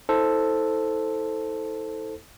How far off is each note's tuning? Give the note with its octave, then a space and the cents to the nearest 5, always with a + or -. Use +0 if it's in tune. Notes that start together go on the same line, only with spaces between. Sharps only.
E4 -45 A4 +0 C5 +0